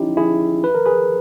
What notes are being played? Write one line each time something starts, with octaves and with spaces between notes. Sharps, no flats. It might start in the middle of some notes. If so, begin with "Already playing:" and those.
Already playing: C#4 D#4 E4 G4
E4 G#4
B4
A#4
G#4 B4